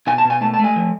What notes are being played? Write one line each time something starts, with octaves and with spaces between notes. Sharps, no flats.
B2 G#5
A5
B2
G#5
A3 A5
A5
A3 G#5
F3